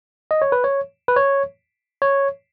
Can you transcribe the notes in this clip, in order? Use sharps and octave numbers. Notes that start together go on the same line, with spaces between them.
D#5
C#5
B4
C#5
B4
C#5
C#5